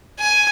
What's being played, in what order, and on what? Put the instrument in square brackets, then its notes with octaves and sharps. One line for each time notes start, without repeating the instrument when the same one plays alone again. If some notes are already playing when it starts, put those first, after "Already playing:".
[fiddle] G#5